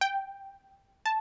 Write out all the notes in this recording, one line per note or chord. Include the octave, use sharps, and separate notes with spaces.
G5
A5